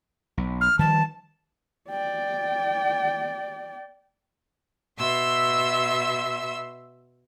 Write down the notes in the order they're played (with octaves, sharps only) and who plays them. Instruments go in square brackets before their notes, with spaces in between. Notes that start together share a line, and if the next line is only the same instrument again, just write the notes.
[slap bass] B1
[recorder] F6
[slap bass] D#3 F3 G3 [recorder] A5
[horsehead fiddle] D5 G5
[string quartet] B2 E5 C6 E6